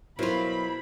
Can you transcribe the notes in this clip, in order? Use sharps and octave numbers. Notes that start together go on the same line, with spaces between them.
B2 F#3 E4 F4 A#4 C5 B5